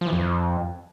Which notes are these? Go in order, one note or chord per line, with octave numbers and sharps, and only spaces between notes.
F3
E3
F2